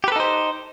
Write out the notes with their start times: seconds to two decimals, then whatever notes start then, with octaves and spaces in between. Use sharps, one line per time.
0.04 G4
0.08 B4
0.12 A4
0.16 D#4
0.20 C5